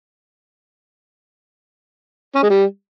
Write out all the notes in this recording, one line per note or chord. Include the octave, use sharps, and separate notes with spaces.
C#4
G#3
G3